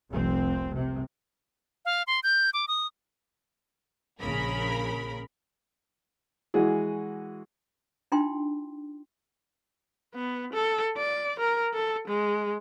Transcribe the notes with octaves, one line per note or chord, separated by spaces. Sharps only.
F1 C2 C4
C3
F5
C6
G6
D6
D#6
A#1 C#3 A#4 B5
E3 G#3 F#4 G#4
D4 D#4 F4 G5 C6
B3
A4
D5
A#4
A4
G#3